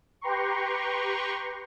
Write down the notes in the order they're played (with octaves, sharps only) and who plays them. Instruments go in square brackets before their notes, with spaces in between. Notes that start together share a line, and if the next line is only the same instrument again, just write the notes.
[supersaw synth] G4 B4 G5 A#5 C6 C#6